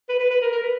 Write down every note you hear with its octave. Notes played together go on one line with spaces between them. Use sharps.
B4
B4
B4
A#4
A#4
B4